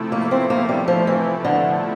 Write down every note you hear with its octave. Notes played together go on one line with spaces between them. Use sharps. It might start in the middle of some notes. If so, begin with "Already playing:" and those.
Already playing: C3 F3 A3 E4
A#3
C4
A#3
G3
F3
E3
D3